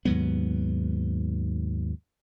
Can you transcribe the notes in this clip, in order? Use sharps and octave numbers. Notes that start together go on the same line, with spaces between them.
D#2 G#2 F#3 B3